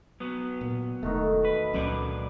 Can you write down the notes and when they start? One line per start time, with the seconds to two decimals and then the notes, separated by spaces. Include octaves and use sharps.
0.20 F#3 B3
0.61 A#2
1.03 E1 D#3 A3 D#4 F#4 A4
1.45 B4
1.74 C#2 A#2 F#3 C#4 D4 B4 D5